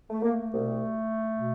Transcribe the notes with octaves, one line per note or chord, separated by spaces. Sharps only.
A3
A#3
A3
C2 B2
B2